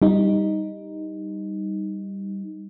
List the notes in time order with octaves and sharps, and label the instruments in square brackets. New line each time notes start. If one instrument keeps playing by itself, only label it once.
[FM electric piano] G3 D#4